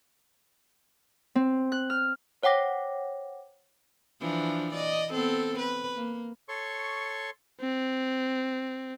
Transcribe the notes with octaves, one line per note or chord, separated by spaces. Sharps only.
C4
F#6
F6
C5 C#5 F#5 G5 D6 A#6
E3 F3 D4
D5 D#5
B3 C4 A4
B4
A#3
A4 C#5 C6 C#6
C4